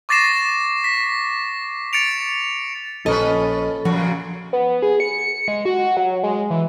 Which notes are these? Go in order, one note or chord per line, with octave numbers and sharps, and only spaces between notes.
C#6 D6 A6 A#6 C7 E7
B6
A6 C#7 D7 F7
A#1 F3 C#4 A4 B4 D#5
F#2 A#2 C#3 F3 F#4
B3
G#4
C#7
G#3
F#4
F#3
G#3
E3